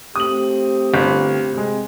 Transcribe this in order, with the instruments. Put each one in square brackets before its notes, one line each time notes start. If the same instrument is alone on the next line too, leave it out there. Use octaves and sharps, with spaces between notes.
[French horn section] A3 C4 G4 [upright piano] D#6 F#7
[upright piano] G1
C3 G#3